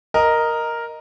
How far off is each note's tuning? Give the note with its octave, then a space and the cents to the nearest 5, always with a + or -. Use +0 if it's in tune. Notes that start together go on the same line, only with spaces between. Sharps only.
A#4 +0 D#5 +0